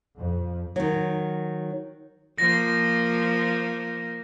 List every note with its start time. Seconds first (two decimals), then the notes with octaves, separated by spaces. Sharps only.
0.16 F2
0.76 D#3 F#3
2.38 F3 A#3 A#6